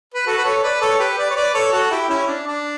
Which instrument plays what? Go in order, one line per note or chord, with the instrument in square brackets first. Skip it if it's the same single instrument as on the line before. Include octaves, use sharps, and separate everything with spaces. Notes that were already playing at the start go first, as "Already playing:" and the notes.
[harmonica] B4
F#4 A4
B4
A4 C#5
B4 D5
A4 C#5
G4 B4
B4 D5
C#5
B4 D5
A4 C#5
F#4 A4
E4 G4
C#4 E4
D4
D4